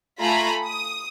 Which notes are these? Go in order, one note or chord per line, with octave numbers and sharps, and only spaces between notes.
A3 F4 G#5 A#5 B5
D#6